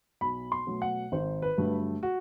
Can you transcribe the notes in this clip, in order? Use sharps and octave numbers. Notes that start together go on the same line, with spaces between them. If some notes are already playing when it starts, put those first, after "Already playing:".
B1 B5
C6
B2 F#3 A3
F#5
G#1 C5
B4
G2 D3 F#3 A3
F#4